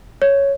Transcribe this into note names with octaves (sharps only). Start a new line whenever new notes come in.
C#5